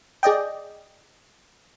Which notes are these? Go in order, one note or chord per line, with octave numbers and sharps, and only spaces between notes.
G#4 D5 D#5 G5